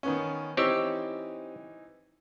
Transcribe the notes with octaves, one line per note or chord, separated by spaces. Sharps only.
D#3 B3 C#4
E3 C4 D#4 G4 C#5 E6